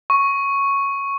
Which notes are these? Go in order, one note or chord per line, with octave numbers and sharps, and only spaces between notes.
C#6